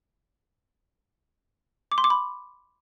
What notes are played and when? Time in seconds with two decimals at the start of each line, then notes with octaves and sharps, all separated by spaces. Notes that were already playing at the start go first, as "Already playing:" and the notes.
1.92 D6
1.98 C6
2.04 D6
2.10 B5